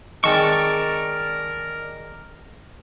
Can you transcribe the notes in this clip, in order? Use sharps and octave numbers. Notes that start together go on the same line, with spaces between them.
D#3 G#3 C4 A#4 D5 A5 C#6